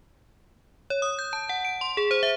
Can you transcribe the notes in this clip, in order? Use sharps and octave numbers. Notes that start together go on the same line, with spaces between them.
C#5
D#6
G6
A5
F#5
D7
C6
G#4
C5
E5